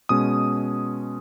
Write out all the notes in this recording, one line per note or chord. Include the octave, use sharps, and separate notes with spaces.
B2 G#3 C#4 D#6